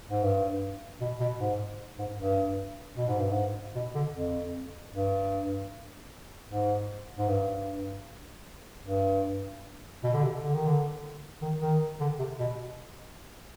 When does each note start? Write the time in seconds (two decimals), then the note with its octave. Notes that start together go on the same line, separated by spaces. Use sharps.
0.10 G#2
0.23 G2
1.01 B2
1.20 B2
1.40 G#2
1.99 G#2
2.18 G2
2.98 B2
3.08 G#2
3.19 G2
3.30 G#2
3.75 B2
3.95 D3
4.16 F2
4.94 G2
6.50 G#2
7.19 G#2
7.29 G2
8.86 G2
10.04 B2
10.13 D3
10.24 C3
10.44 D3
10.54 D#3
10.67 D3
11.42 D#3
11.61 D#3
12.00 D3
12.19 C3
12.39 B2